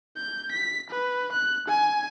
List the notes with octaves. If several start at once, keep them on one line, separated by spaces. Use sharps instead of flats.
G6
B6
B4
F#6
G#5